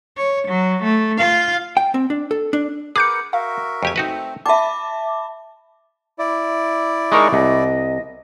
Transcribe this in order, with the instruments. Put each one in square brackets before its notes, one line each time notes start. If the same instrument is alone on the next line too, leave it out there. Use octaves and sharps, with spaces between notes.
[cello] C#5
F#3
A3
F4 F5
[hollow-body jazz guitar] G5
C4
D4
A4
D4
[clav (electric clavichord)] G#4 [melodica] A#4 B4 F#5 [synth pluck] D6 G6 C#7
[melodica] F#4 A#4 E5 [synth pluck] F5
[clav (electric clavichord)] F2 G4 G#5
[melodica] A3 C4 [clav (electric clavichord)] D#4 F#4 B4
[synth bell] E5 D6 [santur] A5 B5
[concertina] E4 D5
[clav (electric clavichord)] G#3 D#4 A#4 [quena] C#6
[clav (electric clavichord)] C2 [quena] D#5